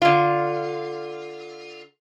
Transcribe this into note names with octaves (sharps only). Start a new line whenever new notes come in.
D3 F4